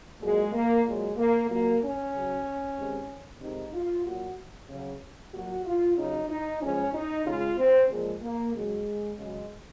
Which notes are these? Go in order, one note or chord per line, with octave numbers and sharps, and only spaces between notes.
A#2 F#3 G#3
A#3
A#2 F#3 G#3
A#3
A#2 F#3 A#3
C#4
C#3 F#3
C3 D#3 G#3
C3 D#3 G#3 D#4
F4
A#2 F#3 F#4
C#3 F#3
A#2 F#3 F#4
F4
C#3 F#3 D#4
D#4
C#3 F3 G#3 C#4
D#4
C#3 G#3 F4
C4
A#2 F3 G#3
A#3
C#3 F#3 G#3
C#3 F#3 G#3